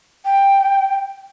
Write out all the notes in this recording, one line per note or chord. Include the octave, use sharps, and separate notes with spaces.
G5